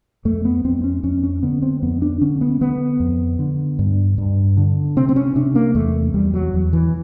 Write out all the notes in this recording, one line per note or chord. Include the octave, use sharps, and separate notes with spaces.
F2 A3
B3
F2 C4
C#4
F2 C#4
C#4
D3 B3
C4
F2 B3
D4
D3 C#4
B3
D3 B3
F2
D3
G2
G2
D3
C3 C4
C4
C#4
C3 D4
A#3
E2 A3
E2 G3
F#3
E2
E3